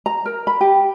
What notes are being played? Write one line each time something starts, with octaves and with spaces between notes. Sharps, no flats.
A#5
A#4
B5
G4